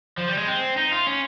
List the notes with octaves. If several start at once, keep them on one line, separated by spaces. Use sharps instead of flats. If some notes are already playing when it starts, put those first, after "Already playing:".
F3
G3
G#3
C4
D#4
F4
C#4